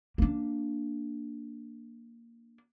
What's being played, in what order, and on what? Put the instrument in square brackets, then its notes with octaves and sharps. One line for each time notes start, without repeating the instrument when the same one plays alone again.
[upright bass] A#3 D4